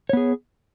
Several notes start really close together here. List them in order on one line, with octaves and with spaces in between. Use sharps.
C#5 B3 G#4